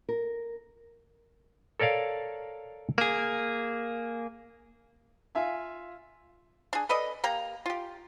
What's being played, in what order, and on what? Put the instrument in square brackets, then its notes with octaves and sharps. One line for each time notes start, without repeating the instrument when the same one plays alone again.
[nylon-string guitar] A#4
[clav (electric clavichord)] A4 A#4 C#5 D5 F5
[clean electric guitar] A#3 G#4
[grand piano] F4 E5 F5 G#5
[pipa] D4 G#4
A4 B4 D5 D#5
A#3 G4 A#5
F4 G4